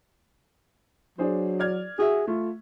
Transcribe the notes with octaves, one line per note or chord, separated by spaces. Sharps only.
F#3 D4 G#4 C5
D5 F6 G#6
F#4 G#4 E5
A3 F4